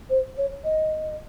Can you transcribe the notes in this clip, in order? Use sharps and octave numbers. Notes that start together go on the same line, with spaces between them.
C5
C#5
D#5